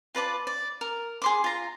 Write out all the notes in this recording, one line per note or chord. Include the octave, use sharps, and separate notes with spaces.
F4 B4 D5 A5
D5
A#4
G#4 C6 D6
F4 A#5